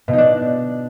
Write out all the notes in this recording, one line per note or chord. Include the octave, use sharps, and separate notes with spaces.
B2
D#4
D4